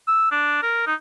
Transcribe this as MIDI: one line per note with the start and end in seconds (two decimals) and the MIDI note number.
0.08 0.27 88
0.31 0.59 62
0.63 0.82 70
0.87 0.95 63